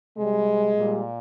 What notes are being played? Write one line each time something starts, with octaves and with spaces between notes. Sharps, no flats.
C3 G3 G#3
A#2 G3